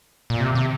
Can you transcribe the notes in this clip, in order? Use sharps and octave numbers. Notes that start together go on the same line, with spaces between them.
A#2
C3
C3